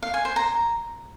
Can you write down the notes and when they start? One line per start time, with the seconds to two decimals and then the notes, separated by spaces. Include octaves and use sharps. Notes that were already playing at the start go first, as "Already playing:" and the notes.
0.03 F5
0.14 G#5
0.25 C5
0.36 A#5